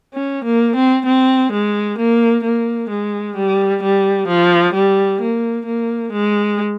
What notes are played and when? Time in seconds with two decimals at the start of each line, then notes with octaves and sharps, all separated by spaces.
0.14 C#4
0.44 A#3
0.76 C4
1.06 C4
1.53 G#3
1.98 A#3
2.44 A#3
2.90 G#3
3.36 G3
3.83 G3
4.28 F3
4.74 G3
5.21 A#3
5.66 A#3
6.12 G#3